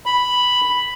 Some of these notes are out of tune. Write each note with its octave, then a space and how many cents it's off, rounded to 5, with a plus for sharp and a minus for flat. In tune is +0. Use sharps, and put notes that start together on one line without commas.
B5 +0